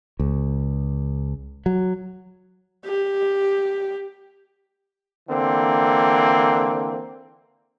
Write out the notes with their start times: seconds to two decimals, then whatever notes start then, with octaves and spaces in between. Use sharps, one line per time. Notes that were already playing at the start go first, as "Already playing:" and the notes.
0.19 C#2
1.66 F#3
2.85 G4
5.29 D3 E3 A#3 C4